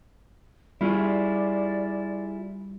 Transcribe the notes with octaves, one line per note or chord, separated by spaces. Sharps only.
G3 E4 F4 G#4 D5